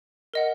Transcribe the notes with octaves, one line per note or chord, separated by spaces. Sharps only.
A#4 D#5 F#5